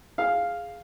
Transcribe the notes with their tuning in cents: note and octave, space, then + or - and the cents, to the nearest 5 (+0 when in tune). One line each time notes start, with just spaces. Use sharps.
G#4 +0 F5 +0